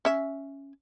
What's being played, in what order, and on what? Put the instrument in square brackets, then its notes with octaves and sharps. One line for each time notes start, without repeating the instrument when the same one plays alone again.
[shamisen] C#4 E5